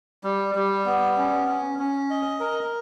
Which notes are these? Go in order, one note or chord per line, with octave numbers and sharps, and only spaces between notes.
G3
G3
B3
C#4
C#4
C#4
D#5
A#4